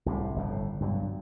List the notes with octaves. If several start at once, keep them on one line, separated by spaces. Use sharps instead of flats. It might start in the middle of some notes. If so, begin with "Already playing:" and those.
C2 A2 C3
G1 F2 A2
G2 B2 F#3